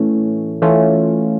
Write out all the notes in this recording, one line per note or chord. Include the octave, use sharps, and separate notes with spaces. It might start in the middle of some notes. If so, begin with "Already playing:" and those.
Already playing: A2 E3 A3 C#4
E3 A3 C#4 F4